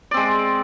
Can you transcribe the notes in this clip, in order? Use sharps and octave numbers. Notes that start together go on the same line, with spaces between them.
G#3 C4 D5